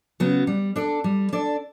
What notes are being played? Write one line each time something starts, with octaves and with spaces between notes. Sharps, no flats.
C#3 F#3 B3 F#4
G3
D4 A4 D5
G3
D4 A4 D5